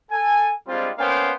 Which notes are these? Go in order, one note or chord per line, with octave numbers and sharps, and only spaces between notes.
A4 G#5
G3 G#3 C4 D4 F4
A#3 B3 C#4 C5 F5 G5